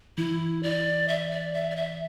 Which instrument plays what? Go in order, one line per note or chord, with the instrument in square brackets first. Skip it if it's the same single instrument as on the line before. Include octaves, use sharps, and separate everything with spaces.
[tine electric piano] E3 [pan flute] E4
[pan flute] D5
E5
D5
E5
D5
E5